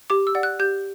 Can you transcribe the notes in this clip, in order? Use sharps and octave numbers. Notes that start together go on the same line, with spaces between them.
G4 D6
E6
D5 F#5
F#6
G4 G6